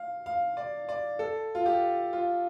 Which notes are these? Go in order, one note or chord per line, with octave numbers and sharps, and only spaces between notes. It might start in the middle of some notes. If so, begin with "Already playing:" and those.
Already playing: F5
F5
D5
D5
A4
F4
G4
F4